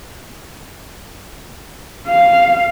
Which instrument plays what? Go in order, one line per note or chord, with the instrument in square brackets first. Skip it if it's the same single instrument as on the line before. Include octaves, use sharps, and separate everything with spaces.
[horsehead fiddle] F5